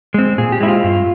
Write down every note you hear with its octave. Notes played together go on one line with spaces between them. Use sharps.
G#3 C4
A#2 G#4
G4
G#3 C4 E4
F4
G2